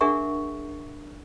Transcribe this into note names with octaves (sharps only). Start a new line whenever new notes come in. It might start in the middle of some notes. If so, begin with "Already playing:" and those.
D4 G#4 A#4 E5 F#5 C#6